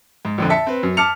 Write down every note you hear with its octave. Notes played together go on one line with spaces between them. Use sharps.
G#2
A#1 F2 D3
E5 A5 B6 C#7
C4 B4
F#2
A5 D6 F6 C#7 F7